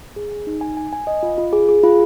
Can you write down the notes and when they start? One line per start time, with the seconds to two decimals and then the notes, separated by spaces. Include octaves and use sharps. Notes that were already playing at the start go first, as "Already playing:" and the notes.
0.16 G#4
0.31 G#5
0.47 D#4
0.61 G#5
0.77 G#5
0.93 G#5
1.07 D#5
1.23 F4
1.38 F4
1.53 G#4
1.69 G#4
1.83 F4